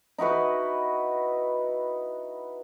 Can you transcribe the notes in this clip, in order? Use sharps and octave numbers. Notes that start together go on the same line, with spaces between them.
D#4 E4 F#4 B4